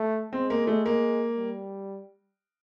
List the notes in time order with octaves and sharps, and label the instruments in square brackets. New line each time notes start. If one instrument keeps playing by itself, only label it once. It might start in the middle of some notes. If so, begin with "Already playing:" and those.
Already playing: [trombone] A3
[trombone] G#3 [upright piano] C4
[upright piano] A#3
A3
A#3
[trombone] G3